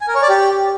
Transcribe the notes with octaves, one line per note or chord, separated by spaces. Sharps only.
G#5
A#4
C#5
D5
G4